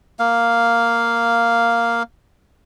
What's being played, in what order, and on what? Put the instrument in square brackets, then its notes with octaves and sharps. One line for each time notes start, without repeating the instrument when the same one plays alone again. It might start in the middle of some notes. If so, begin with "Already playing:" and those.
[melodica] A#3 F5